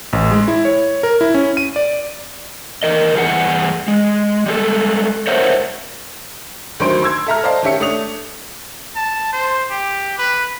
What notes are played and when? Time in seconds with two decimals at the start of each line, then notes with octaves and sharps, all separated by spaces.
0.13 A1
0.31 G#3
0.48 E4
0.65 C#5
1.03 A#4
1.21 E4
1.34 C#4
1.57 D#7
1.76 D5
2.83 E2 A#4 D#5
3.15 E2 G2 G#4 F#5
3.88 G#3
4.46 G3 G#3 A4
5.27 A#4 C5 C#5 E5 F#5
6.80 D2 D#3 F#3 C5 C6 D7
7.03 C6 E6 G#6
7.27 A4 E5 A#5 F6
7.43 C5 D5 D#5 F5 A5
7.63 D#3 C#4 G4 E5 C#7
7.80 A3 D4 C#5 D#6 F7
8.96 A5
9.33 C5
9.70 G4
10.18 B4